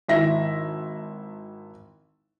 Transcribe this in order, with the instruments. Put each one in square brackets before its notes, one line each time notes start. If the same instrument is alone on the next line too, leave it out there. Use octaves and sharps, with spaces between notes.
[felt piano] G#1 E4 E5 A#6